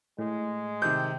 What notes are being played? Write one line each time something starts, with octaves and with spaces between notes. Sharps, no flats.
A2 G#3
C3 D#3 G6